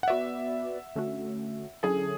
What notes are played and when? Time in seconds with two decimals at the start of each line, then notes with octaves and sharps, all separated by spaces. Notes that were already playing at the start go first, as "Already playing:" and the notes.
0.03 F#5
0.08 B3 F#4 B4 D5 E5
0.96 D3 A3 C#4 F#4
1.83 D3 F#3 C#4 E4 G#4 A4